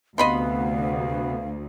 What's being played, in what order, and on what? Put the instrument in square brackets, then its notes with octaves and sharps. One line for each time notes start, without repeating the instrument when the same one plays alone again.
[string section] D2 [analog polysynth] C3 B3 [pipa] D#5 B5 C6 [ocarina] F5